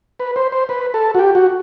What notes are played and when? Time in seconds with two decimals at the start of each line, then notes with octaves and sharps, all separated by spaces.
0.20 B4
0.36 C5
0.52 C5
0.69 B4
0.94 A4
1.15 F#4
1.19 G4
1.35 F#4